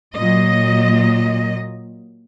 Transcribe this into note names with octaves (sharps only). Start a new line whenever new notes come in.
A#2 F#3 D#5